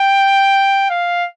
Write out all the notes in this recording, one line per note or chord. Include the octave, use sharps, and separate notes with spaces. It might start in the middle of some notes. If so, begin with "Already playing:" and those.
Already playing: G5
F5